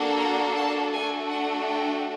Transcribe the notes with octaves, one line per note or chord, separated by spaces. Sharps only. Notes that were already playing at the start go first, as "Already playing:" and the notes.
Already playing: A#3 D4 F#4 A4
A#5
A5
A3 D4 F#4 A4 G#5
F#5
G5